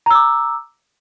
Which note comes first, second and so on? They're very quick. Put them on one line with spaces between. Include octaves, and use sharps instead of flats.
A#5 E6 D6